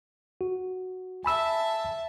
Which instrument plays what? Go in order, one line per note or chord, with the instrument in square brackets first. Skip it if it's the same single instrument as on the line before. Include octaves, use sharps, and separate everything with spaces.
[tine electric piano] F#4
[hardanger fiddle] E5 A5 [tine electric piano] G#5 B5 E6